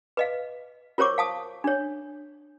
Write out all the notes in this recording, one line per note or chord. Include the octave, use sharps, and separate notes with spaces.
B4 D#5 F5
F4 A#4 C5 C#5 C#6 D6
F5 A5 D#6
D4 C#5